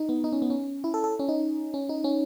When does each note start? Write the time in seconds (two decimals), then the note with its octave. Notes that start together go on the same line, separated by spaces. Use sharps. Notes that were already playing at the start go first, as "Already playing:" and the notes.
Already playing: D#4
0.09 B3
0.24 D#4
0.33 C#4
0.42 B3
0.50 C#4
0.84 E4
0.94 A4
1.04 A4
1.19 C#4
1.29 D#4
1.74 C#4
1.89 D#4
2.04 C#4